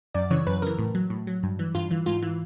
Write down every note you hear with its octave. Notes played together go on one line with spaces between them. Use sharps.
F#2 D5
C#3 E3 C#5
F#2 B4
C#3 E3 A#4
A2
F#3
A2
F#3
G2
E3
G2 F4
E3
G#2 F4
E3